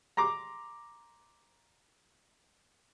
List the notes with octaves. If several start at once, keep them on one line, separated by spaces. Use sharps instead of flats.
A#5 C6 D6